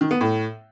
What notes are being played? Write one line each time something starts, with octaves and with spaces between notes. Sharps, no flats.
D#3
B3
A2